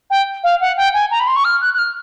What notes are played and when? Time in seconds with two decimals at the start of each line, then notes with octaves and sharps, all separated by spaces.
0.10 G5
0.43 F5
0.60 F#5
0.77 G5
0.93 G#5
1.11 A#5
1.19 B5
1.27 C6
1.35 C#6
1.44 F6
1.61 F#6
1.74 F#6
1.78 F6